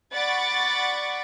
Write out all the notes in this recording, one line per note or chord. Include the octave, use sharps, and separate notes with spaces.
D5 F#5 B5 C#6 D6 A6